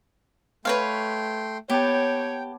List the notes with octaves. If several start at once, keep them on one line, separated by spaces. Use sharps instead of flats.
A3 B4 C#5 F5 G5 C6
B3 G4 C#5 G5 A5